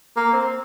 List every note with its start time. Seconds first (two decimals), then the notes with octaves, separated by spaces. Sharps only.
0.16 A#3
0.33 C4